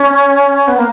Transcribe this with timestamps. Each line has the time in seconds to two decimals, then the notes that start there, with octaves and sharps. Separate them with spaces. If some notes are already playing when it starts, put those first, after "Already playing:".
Already playing: C#4
0.68 B3
0.77 A#3